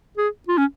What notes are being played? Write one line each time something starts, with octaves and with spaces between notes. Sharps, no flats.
G#4
F4
C#4